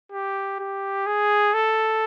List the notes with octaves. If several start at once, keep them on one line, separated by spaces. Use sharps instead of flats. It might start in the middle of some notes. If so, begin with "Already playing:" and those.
G4
G4
G#4
A4